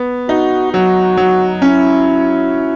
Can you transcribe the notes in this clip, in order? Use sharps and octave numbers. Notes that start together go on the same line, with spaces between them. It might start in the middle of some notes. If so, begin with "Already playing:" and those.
Already playing: B3
D#4 F#4
F#3 F#4
F#3
C#4 E4